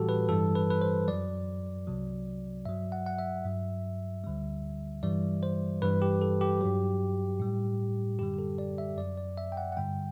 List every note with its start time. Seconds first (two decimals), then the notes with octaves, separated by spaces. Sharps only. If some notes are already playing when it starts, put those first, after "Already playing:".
Already playing: A2 E3 G3 F#4 G4 A4
0.09 B4
0.29 G2 E3 G3 A4
0.55 B4
0.70 B4
0.82 C5
1.08 F#2 F#3 D5
1.87 C2 C3 F#3
2.65 G2 F#3 E5
2.92 F#5
3.06 F#5
3.19 E5
3.45 G2 F#3
4.24 D2 D3 G3
5.03 G2 E3 G3 D5
5.43 C5
5.82 G2 E3 G3 B4
6.02 G4
6.21 A4
6.41 G4
6.61 G2 F#3
7.40 A2 G3
8.19 F#2 D3 G3 G4
8.34 G4
8.39 A4
8.58 D5
8.78 E5
8.98 F#2 F#3 D5
9.17 D5
9.38 E5
9.52 G5
9.57 F#5
9.72 F#5
9.77 G2 D3 G3 G5